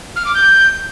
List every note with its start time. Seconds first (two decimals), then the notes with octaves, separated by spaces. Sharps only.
0.16 F6
0.25 D6
0.35 G6